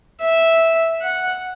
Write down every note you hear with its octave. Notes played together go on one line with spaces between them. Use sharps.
E5
F#5